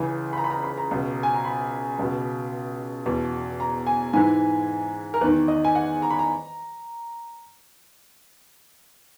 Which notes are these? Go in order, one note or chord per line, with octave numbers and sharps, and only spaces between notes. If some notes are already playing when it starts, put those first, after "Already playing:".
Already playing: C#2 C#3 E3 G#5
B5
A#5
B5
A#5
B5
A#5
C#2 B2
G#5
A#5
B5
C#2 B2
E2 B2
A#5
G#5
G#2 E3 G#5
A#4
E2 D#3 B4
D#5
G#5
F#5
A#5
B5
A#5